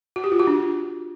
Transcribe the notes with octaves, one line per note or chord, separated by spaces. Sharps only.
F#4
G4
F4
F#4
D4